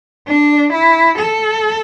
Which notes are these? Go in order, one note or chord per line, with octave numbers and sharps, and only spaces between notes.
D4
E4
A4